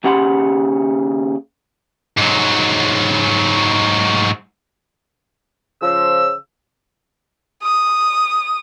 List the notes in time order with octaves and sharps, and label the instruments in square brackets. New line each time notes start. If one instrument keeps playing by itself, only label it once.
[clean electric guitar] D#2 C#3 G4 F#5 B5 C6
[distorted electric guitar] G#2 F#3
[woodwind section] C#3 F3 E6
[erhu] D#6